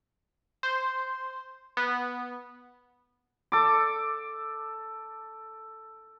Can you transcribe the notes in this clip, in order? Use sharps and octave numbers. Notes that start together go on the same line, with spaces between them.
C5
B3
A4 D6